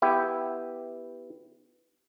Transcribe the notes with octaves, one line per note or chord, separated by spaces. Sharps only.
B3 E4 G4